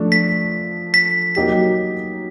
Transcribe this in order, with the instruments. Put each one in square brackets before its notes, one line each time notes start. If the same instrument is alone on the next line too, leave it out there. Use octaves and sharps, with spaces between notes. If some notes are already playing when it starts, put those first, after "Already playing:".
Already playing: [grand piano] F3 A3 D4
[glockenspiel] B6
B6
[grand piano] F#3 A#3 D#4 G4 [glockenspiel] B6